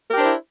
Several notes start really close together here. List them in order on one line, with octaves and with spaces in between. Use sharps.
A#4 G4 D4 C5 E4